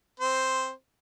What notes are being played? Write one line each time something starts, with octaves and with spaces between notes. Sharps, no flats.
C4 C5